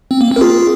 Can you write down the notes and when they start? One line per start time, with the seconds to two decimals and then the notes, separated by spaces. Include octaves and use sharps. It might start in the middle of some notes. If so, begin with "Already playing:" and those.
0.11 C4
0.21 A#3
0.31 C4
0.36 A#4
0.41 F4 G#4